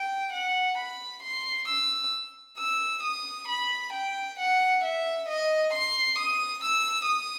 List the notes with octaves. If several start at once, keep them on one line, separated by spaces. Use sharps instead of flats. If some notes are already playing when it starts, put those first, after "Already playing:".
Already playing: G5
F#5
B5
C6
E6
E6
D#6
B5
G5
F#5
E5
D#5
C6
D#6
E6
D#6